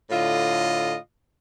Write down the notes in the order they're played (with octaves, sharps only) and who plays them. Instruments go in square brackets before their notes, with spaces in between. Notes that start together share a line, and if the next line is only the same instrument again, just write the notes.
[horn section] A2 D3 F4 D#5